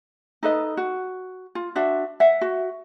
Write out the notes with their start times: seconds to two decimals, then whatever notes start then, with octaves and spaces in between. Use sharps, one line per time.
0.43 D#4 A4 B4 D#5
0.77 F#4
1.55 F4
1.75 D4 F#4 E5
2.20 E5 F#5
2.41 F#4